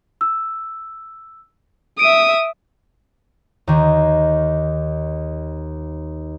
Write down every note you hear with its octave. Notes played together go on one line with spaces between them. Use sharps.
E6
E5 D#6 D7 D#7
D#2 D#3